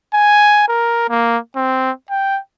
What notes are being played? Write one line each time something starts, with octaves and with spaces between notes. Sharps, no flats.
G#5
A#4
A#3
C4
G5